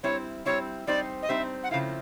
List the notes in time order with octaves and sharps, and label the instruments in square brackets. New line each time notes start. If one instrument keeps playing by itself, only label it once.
[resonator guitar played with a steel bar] G3 C4 E4 [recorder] C#5
[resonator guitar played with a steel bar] G3 C4 E4 [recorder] C#5
[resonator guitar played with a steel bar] G3 C4 D#4 G4 C5 [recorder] D5
[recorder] D#5
[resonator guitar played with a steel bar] G3 C4 D#4 G4 C5 [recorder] E5
[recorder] F#5
[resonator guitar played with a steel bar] C#3 F3 A3 C4 E4 [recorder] F5